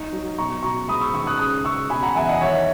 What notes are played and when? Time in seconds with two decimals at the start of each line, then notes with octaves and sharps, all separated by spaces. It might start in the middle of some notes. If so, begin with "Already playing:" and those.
Already playing: D#4
0.13 F#3
0.38 B2 A#5 C#6
0.63 B2 A#5 C#6
0.88 G#2 B5 D#6
1.01 C#6 E6
1.14 D#3 C#6 E6
1.27 D#6 F#6
1.39 C#3 D#6 F#6
1.64 C#3 C#6 E6
1.90 B2 G#5 B5
2.03 F#5 A#5
2.15 E2 E5 G#5
2.29 D#5 F#5
2.41 D#3 C#5 E5